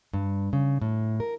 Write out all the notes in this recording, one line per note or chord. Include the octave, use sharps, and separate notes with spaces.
G2
C#3
A2
A#4